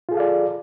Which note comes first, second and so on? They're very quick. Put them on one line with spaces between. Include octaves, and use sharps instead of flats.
F4 G#4 A4 F5 D5